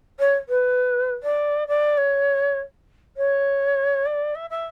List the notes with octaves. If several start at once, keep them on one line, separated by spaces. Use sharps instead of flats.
C#5
B4
D5
D5
C#5
C#5
D5
E5
E5